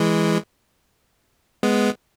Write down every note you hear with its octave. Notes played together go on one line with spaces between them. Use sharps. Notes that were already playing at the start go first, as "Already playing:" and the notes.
Already playing: E3 G#3
G#3 B3